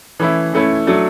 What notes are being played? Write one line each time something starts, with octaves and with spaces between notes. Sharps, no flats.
E3 A3 C#4 E4
E3 A3 C#4 E4
F#3 A3 D4